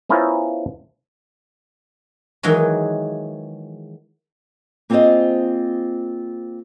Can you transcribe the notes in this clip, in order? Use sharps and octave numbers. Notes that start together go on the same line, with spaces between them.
B3 C#4 E4 F4 A#4 C5
D#3 E3 F#3 G#3
A#3 C4 F4 G#4 C5 D#5